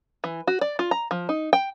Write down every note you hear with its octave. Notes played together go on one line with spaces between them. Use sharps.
E3
F#4
D5
F4
A#5
F3
D#4
G5